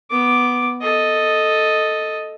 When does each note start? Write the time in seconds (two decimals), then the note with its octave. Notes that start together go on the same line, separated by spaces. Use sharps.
0.11 B3 D6
0.82 A4 D#5